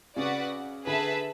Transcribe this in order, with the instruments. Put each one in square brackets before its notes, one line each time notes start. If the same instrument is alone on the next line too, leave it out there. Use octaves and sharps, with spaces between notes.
[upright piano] C#3 [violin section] F#4 B4 D5 F#5
[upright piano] D3 [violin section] G#4 B4 E5 A5